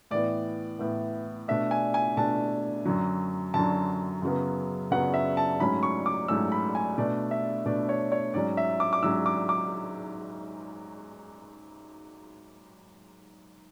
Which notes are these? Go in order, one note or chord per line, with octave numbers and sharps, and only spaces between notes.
A2 E3 B3 D5
A2 E3 B3
B2 A3 D4 E5
G#5
G#5
B2 A3 D4 A5
F#2 D3 F#3
F#2 D3 F#3 A5
F#2 C#3 F#3 B3
F#2 C#3 F#3 B3 F#5
E5
A5
G#2 F#3 A3 C#4 B5
C#6
D6
G#2 F#3 A3 C#4 E6
B5
G#5
B2 A3 D4 D5
E5
B2 A3 D4 D5
C#5
C#5
G#2 F#3 C#4 D5
E5
D6
D6
G#2 F#3 C#4 E6
D6
D6